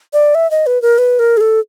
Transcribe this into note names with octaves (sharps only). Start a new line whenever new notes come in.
D5
E5
D#5
B4
A#4
B4
A#4
G#4
A4